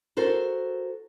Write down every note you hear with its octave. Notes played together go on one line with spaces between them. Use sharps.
F#4 A4 A#4 C5